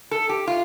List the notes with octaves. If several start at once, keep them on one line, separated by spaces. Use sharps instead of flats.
A4
G4
F4